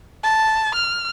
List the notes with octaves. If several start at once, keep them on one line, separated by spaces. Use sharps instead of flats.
A5
F6